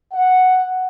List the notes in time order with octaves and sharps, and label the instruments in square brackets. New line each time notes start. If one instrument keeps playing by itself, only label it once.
[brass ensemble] F#5